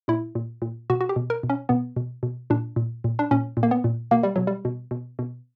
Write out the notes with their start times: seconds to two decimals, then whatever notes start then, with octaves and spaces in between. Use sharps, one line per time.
0.08 A#2 E4
0.35 A#2
0.62 A#2
0.90 B2 F#4
1.01 F#4
1.09 G4
1.16 B2
1.30 A#4
1.43 B2
1.50 C#4
1.69 B2 B3
1.96 B2
2.23 B2
2.50 A#2 D4
2.76 A#2
3.04 A#2
3.19 D4
3.31 A#2 C#4
3.57 A#2
3.63 A#3
3.71 B3
3.84 A#2
4.11 B2 A#3
4.23 G3
4.36 B2 F#3
4.47 G3
4.65 B2
4.91 B2
5.19 B2